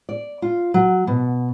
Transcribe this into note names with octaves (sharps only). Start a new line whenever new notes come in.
D5
F4
F#3
B2